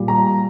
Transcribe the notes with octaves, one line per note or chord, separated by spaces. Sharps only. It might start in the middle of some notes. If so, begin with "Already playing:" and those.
Already playing: A#2 G3
A#5